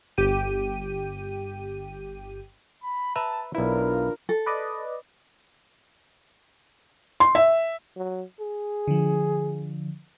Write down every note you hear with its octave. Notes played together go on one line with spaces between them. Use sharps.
G1 G4 G5 D#7
B5
B4 E5 A5 A#5
B1 D4 E4 F4 A#4 B4
A4
B4 D5 D#5
C6
E5
F#3
G#4
D3 F3